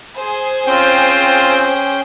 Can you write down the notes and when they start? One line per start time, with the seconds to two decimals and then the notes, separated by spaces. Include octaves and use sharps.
0.16 G#4 C5
0.66 C4 C#4 F4 G5